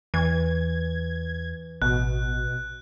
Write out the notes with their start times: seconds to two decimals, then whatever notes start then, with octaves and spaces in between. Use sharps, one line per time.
0.14 E2 E3 G#6
1.82 A1 B2 F#6